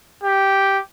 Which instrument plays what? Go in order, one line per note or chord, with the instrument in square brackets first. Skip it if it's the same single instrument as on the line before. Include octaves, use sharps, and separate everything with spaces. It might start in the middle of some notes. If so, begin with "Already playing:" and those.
[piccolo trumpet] G4